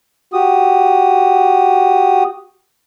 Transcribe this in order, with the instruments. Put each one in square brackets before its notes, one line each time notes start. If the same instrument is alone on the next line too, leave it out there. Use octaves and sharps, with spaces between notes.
[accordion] F#4 G4 D#6